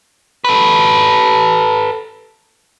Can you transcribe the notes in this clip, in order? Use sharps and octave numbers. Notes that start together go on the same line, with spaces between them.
A4 B4